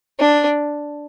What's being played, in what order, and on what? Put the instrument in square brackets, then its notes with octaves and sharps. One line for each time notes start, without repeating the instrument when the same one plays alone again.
[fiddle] D4